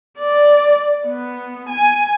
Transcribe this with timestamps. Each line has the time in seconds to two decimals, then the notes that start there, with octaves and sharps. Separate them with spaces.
0.19 D5
1.07 B3
1.69 G#5